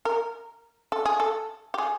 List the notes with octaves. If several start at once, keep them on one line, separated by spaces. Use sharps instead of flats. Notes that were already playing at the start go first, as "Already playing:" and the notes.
A#4
A4
G#4
A4
G4
G#4